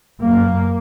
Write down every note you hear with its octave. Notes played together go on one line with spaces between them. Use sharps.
F#2 A#3